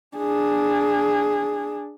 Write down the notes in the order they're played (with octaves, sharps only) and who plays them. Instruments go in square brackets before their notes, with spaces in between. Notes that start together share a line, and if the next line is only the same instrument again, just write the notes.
[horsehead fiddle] D4 G#4